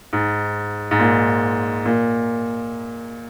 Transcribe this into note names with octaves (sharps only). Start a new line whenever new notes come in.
G#2
G#2
A#2
A#2